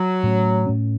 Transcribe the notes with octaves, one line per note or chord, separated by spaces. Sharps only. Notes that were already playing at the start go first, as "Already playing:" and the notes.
Already playing: F#3
A2 A3 C#4
A2 A3 C#4